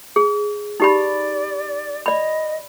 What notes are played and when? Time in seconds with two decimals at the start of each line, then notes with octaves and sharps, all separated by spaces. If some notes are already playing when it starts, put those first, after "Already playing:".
0.16 G#4
0.80 D#4 G4 D5 B5
2.06 D5 D#5 B5